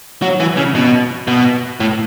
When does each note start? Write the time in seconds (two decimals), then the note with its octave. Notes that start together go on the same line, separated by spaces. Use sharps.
0.22 F#3
0.40 E3
0.57 C#3
0.75 B2
1.28 B2
1.80 A2